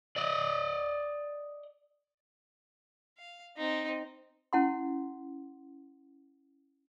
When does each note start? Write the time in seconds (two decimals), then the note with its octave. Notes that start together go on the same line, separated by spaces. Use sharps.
0.16 D5 D#5
3.18 F5
3.57 C4 D#4
4.53 C#4 E4 F#5 C6